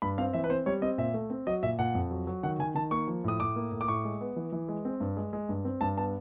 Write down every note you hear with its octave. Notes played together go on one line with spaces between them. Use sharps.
G2 B5
C4 F5
E3 E5
B4
C4 C5
G3 C#5
C4 D#5
A#2 E5
A3
C4
F#3 D#5
A#2 E5
A#2 F#5
F2
F#3
F#3
D#3 F#5
D#3 G#5
D#3 A5
A#3 C#6
F3
A2 D#6
A2 D6
A#3
A2
D6
A2 C#6
G#3
B3
E3
E3
G#3
C4
G2
G#3
G#3
G2
C4
G2 A5
B3 A5